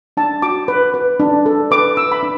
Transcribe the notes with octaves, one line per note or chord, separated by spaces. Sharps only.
D4 A5
F#4 D6
B4
B4
D4
A4
B4 D6
B4 E6
B5
D4